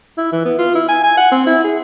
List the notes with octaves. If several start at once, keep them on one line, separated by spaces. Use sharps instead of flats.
E4
E3
B3
F4
E4
G#5
G#5
F#5
C4
E4
G#4